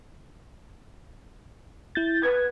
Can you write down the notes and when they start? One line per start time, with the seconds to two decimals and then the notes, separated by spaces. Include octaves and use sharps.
1.95 E4 G6 A6
2.23 B4 G#6